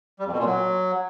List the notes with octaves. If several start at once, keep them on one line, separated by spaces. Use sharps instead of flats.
G3
F2
B2
A#2
F#3